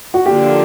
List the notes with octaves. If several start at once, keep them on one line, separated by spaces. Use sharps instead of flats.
F#4
D3 F3 A#3 D4 F4 G4